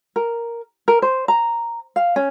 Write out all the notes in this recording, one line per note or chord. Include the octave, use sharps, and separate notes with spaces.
A#4
A#4
C5
A#5
F5
C#4